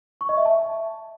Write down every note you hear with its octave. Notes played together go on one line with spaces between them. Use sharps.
C#6
D#5
E5
A5